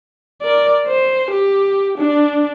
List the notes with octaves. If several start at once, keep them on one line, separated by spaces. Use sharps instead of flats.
A#4 D5
C5
G4
D4